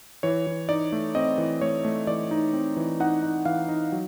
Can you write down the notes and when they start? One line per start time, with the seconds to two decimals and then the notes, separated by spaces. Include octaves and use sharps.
0.23 E3 C#5
0.47 E3
0.69 D#4 D5
0.92 A3
1.15 C4 D#5
1.38 E3
1.61 A3 C#5
1.85 A3
2.07 E3 D5
2.31 D#4
2.53 C4
2.77 E3
3.00 D#4 F#5
3.23 D#4
3.46 E3 F5
3.69 D#4
3.92 F#3